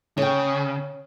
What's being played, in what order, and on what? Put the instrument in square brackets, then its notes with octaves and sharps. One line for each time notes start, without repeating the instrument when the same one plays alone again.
[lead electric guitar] C#3 [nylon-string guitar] C#5 G5